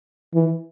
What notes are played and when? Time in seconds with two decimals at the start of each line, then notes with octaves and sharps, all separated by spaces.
0.34 E3